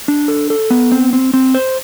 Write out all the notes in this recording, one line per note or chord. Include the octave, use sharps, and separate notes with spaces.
D4
A4
A4
B3
C4
C4
C4
C5